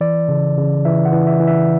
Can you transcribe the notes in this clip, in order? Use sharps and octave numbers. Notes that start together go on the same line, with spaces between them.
E3 D5
C#3
C#3
E3 E5
F#5
E3
E5
E3
E5